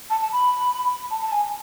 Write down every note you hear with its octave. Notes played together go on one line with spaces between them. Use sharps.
A5
A5
B5
A5
A5
G#5